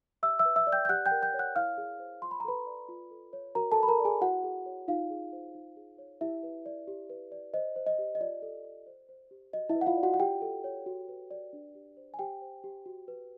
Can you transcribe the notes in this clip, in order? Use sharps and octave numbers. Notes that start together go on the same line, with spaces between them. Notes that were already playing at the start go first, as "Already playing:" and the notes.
G4 E5 E6
E5 E6
B4
E5 E6
D5
G5 G6
G6
G4 F#5 F#6
G5 G6
A#4
G5 G6
C#5
F#5 F#6
E4 F5 F6
G#4
C5
F4 C6
B5
A#5
A4 B4 B5
D5
F4
A4
C#5
F#4 A#4 A#5
A4 A5
B4
B5
A#4 A#5
D5
G#4 G#5
E4 F#4 F#5
G#4
C#5
D#4 F4 F5
G#4
C5
D#4
G#4
C#5
E4 G4 E5
B4
D5
G4
B4
D5
C5 D#5
C5
D#5
G4
D#5
F4 D5
A4
D5
C5
C5
G4
F#4 D#5
E4 E5
B4
F#5
F4 F5
D5
F#4 F#5
F#5
F4 G4 G5
A4
C#5
F#4
B4
D5
D4
G4
C5
G#5
G4 C5 G5
C5
G4
F#4
B4